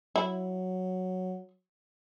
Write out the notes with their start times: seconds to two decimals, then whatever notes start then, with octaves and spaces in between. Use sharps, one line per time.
0.16 F#3 E4